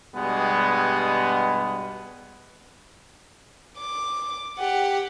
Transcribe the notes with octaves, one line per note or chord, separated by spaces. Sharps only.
G2 B2 G3 G#3 B3
D6
G4 F#5